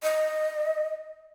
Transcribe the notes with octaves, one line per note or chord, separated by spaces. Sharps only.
D#5